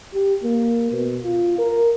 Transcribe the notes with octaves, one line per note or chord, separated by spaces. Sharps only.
G4
A#3
B2
F4
A#4